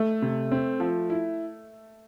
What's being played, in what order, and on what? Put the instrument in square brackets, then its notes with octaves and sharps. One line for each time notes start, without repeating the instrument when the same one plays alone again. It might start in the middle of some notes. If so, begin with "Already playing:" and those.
Already playing: [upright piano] A3
[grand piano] C3
C4
F3
E4